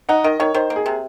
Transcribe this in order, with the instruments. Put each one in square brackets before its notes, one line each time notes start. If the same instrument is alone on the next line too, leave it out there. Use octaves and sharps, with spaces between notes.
[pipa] D#4 [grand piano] F#5
[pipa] D#3 [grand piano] D#5
[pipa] D#3 [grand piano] C#5
[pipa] D#3 [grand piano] C5
[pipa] A#3
[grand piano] G#4
[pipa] C3